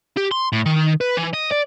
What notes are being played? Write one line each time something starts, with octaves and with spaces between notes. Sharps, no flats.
G4
C6
A2
D#3
B4
E3
D#5
D5